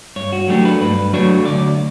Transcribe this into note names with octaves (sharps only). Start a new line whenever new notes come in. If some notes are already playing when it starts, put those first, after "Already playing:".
G2 C#5
F#4
F#3 A3 D4 G4
B4
G2 B4
F#3 A3 D4 C#5
D2 D5